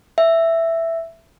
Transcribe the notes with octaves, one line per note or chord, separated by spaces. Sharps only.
E5